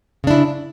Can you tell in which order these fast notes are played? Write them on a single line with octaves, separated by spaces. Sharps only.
C#3 D4 E4